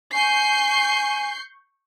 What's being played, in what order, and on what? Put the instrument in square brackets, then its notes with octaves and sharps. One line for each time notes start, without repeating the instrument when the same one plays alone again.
[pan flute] G#5 [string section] C#6 G6 C7